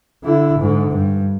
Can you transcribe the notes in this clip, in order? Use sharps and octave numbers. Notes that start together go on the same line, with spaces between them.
D3 E4
G#2 D3
G2